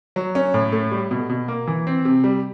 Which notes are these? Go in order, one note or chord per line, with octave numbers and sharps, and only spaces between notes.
F#3
C#4
A2
A3
G3
B2
B2
A#3
E3
C4
C3
G3